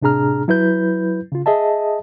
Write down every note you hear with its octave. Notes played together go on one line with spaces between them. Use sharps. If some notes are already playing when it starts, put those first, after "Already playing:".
A2 C3 D4 G#4 A#5 F6
F#3 E4 B4 G6
C#3 F4
G#4 D#5 E5 A5